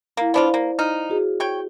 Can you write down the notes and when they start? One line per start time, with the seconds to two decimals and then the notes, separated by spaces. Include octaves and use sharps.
0.17 A#3 E4 F5
0.34 B3 D4 E4 F4 C5 D5
0.54 A#3
0.79 D#4 F6
1.10 F#4 G#4
1.40 C#5 G5